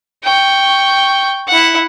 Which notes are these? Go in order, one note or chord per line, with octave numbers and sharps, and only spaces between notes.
G5 C#6
E4 F#5